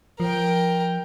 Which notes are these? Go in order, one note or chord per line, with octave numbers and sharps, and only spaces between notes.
F3 A#4 G5